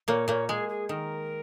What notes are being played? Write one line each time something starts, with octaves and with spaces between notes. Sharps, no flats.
A#2 A#3 C#5
A#2 A#3 C#5
G#3 G#4
G#4
D#3 A#4